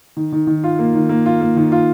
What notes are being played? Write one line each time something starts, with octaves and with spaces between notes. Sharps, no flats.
D#3
D#3
D#3
F4
A#3
D#3
A#3
F4
A#3
D#3
F4